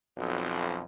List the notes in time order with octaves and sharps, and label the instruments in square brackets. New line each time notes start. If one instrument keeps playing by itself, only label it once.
[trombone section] B1 F2